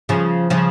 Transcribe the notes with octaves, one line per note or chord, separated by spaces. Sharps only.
C#3 F3
C#3 F3